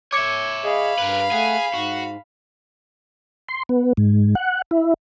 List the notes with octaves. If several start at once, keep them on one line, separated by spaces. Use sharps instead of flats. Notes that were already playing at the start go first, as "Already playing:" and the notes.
C#5 E5 D6 G#6 C#7
G#4 D#5 F5 B5
G2 A#4 B4
A3 G#4 F#5 C7
G#2 F#4
C6
B3
G#2
F#5
E4